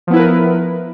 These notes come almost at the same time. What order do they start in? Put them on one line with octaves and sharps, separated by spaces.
F3 B3 E4 B4 A#4